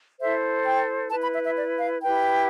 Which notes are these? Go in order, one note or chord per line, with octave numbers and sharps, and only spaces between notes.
E4 A4 C5 E5
G5
E4 B4 A5
B5
E5
E5
D5
F5
E4 G4 B4 G5